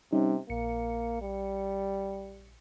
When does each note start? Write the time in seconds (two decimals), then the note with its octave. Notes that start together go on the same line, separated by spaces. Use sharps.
0.13 C3 G3 C#4 D#4
0.50 A#1 A#3 C#7
1.22 G3